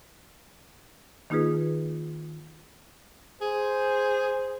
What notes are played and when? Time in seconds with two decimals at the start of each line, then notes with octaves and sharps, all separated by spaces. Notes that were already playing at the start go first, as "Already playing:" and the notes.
1.30 D#3 A#3 D#4 F4 G#4 B4
3.41 G#4 C5